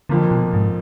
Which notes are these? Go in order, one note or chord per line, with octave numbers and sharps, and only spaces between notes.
F2 D3 F3 A#3
B2
G#2